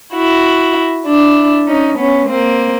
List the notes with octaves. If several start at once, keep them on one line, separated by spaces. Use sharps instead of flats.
E4 F#4
D4 E4
C#4 D#4
B3 C#4
A#3 C4